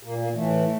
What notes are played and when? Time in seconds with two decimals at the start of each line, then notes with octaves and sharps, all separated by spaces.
0.03 A#2 A#3
0.18 A#3
0.34 A2 E3 A3